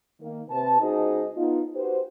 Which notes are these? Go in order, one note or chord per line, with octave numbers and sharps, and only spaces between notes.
D#3 A#3
C3 B4 A5
C#2 D#4 F#4 G#4 C5 D#5
B3 D#4 F4
F#4 G4 B4 C5